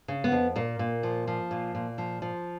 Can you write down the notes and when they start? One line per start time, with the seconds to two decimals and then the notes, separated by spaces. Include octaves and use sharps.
0.08 C#3
0.24 B3
0.32 F2
0.56 A#2 A#3
0.79 A#2
1.03 F3
1.28 F3
1.51 A#2
1.75 A#2
1.98 F3
2.22 F3